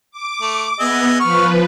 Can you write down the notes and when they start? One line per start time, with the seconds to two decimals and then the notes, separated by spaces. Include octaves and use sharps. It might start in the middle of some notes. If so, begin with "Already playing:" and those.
0.11 D6
0.41 A3
0.79 B3 G#4 D#5 E5
1.20 F3 B4 C#6 F6